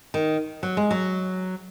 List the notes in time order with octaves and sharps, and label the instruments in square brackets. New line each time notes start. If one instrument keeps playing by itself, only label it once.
[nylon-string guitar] D#3
F#3
G#3
F#3